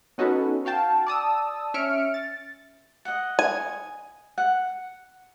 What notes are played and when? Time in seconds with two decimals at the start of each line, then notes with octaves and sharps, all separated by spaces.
0.18 B3 C#4 D#4 F#4 A4 B4
0.65 F#4 F5 G5 A5
1.07 D5 A5 D#6 E6
1.74 C#4 E5 F6 C#7 D7
2.14 A6
3.05 D#5 F#5
3.39 G#5
4.38 F#5